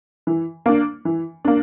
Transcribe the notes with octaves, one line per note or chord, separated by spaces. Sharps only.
E3
A#3 D4
E3
A#3 D4